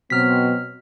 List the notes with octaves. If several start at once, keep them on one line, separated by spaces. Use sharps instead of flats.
B2 F#3 C4 F6 B6